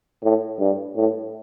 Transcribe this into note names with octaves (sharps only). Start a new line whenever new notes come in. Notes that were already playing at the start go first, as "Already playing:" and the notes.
A2
G2
A2